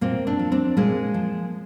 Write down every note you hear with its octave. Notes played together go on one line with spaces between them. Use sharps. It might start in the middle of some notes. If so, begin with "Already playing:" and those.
A#2 A#3 C4
C4 D4
F3
C4 D4
A#2 G#3 A#3
F3